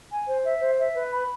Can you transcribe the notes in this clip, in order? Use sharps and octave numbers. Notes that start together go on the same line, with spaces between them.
G#5
C5
E5
C5
E5
B4
B5